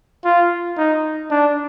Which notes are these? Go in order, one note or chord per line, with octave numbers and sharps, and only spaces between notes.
F4
D#4
D4